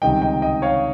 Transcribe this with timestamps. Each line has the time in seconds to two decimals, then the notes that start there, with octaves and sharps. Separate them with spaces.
0.02 C#2 C3 D#3 G3 D#5 G5
0.22 D#5 G5
0.42 D#5 G5
0.62 C#5 F5